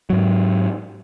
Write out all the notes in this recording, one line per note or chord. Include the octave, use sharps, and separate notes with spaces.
G#2 F#3